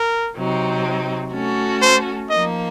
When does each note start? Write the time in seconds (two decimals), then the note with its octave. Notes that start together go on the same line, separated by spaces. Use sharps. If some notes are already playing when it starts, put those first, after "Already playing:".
Already playing: A#4
0.36 C3 F#3 C4 D#4
1.32 A3 C#4 F#4 A4
1.82 C5
2.30 F3 A#3 D#4 D#5